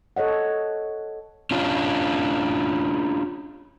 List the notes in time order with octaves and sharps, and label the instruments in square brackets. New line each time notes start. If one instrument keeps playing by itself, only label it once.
[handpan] A4 C#5 D#5 F#5
[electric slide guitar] C#4 D4 F4